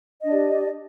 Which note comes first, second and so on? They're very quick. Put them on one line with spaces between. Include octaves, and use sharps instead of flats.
D#5 D4 D5 G4